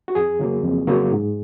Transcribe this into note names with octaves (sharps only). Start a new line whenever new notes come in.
F#4
F2 G#4
C#3 F#3 A#3
F2
C#3 F#3 A#3
G#2